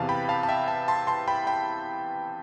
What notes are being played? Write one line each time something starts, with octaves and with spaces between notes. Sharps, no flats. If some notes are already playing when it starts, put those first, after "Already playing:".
Already playing: E2 C3 E3 F5 A5
G5 B5
F5 A5
A5
E5 G5
F5 A5
A5 C6
A5 C6
G5 B5
G5 B5